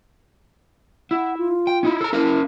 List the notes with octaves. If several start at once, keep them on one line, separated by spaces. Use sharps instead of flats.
E4 F#5
F4
G5
C#4 D#4 E4
A4 A#5
C#4 E4 A#4 F5